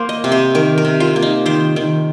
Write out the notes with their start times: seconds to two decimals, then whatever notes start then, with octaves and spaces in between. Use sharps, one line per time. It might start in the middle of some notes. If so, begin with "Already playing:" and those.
Already playing: A#3 A#4 C5
0.09 D#5
0.24 C3
0.32 C5
0.55 D#3 A#4
0.78 A#4
0.85 C3
1.00 F4
1.16 A#3
1.22 D#4
1.46 D#3 C5
1.76 D#3